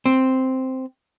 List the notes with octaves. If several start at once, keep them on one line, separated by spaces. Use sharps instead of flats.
C4